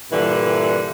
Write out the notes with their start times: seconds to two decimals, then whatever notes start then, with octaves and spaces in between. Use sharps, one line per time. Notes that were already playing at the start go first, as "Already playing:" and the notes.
0.11 G2 A#2 D3 E3